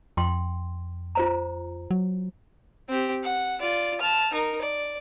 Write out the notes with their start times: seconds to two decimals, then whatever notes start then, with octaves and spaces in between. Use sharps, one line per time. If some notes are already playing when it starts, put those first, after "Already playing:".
0.17 F2 G5 C6
1.15 F4 C5 A#5
1.91 F#3
2.89 C4 G4
3.23 F#5
3.60 F4 D5
4.01 A5 F6
4.33 D#4 A#4
4.62 D5